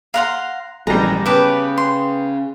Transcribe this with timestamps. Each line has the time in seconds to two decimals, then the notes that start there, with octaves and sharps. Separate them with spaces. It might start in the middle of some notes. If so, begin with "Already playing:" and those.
0.14 F5 F#5 A#5 C6
0.87 A#1 C#3 E3 G3 G#3 A#5
1.26 C#3 B3 G4 B4 A5 D6
1.78 C6